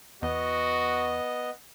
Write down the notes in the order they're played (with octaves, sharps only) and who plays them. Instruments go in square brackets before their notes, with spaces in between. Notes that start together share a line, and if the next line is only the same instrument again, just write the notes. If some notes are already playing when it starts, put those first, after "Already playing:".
[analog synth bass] E2 [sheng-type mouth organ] B3 D#5 [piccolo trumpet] F#4